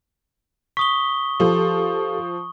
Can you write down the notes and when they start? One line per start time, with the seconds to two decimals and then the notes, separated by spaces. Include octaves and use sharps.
0.77 C#6 D#6 B6 G7
1.40 F3 G4 A4